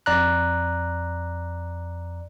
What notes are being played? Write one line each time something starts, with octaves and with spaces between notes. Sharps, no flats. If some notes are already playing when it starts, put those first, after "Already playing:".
F2 D5 A#5 F#6